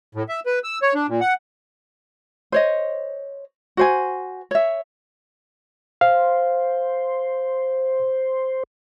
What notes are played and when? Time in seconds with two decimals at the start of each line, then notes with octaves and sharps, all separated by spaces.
0.15 A2
0.29 E5
0.46 B4
0.64 E6
0.82 C#5
0.95 D4
1.08 A#2
1.21 F#5
2.52 C5 C#5 D#5
3.77 F#4 C5 G#5
4.51 C#5 E5
6.01 C5 F5